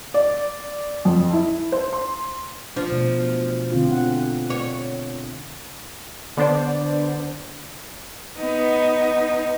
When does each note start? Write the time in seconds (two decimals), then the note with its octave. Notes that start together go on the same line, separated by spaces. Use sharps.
0.14 D5
1.05 F2
1.33 E4
1.72 C5
1.93 C6
2.76 F3 D4
2.92 B2 A3
3.72 D3 C4 F4
3.92 F#5
4.50 C#5
6.37 D3 B3 D4 C5 D5
8.38 B3 D#4